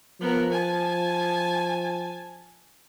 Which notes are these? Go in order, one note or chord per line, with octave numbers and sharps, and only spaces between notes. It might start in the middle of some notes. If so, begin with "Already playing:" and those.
F3 B3 A#4
G#5 A5